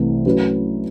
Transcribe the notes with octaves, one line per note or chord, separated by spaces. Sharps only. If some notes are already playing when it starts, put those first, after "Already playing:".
Already playing: C2 C3 E3 A3
F#3 A3 C#4 F#4 B4